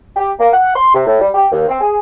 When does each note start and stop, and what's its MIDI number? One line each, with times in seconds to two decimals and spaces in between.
0.16 0.31 67
0.40 0.48 58
0.53 0.73 78
0.75 0.90 84
0.94 1.05 48
1.07 1.20 45
1.21 1.30 55
1.34 1.47 67
1.52 1.68 39
1.69 1.78 60
1.80 1.99 68